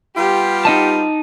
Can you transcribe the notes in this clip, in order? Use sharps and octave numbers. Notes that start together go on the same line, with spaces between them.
G3 B3 F4 G4
D#4 D#5 A5